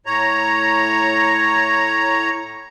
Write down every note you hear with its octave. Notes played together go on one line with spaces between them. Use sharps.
A2 C#5 A#5